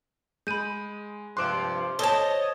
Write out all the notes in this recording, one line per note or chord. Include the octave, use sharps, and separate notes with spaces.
G#3 B5 G6 D#7
G2 C3 F3 C6 D6 F#6 D7 E7
A4 C5 C#5 D#5 A5 G7